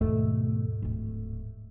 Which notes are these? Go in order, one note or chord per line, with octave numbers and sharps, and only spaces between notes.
D#2 G#2 B2 A3
D1 D#2